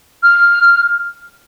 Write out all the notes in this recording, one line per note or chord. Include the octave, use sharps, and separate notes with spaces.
F6